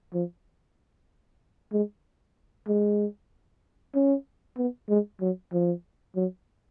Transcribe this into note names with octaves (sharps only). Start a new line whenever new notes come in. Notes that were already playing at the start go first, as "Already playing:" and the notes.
F3
G#3
G#3
C#4
B3
G#3
F#3
F3
F#3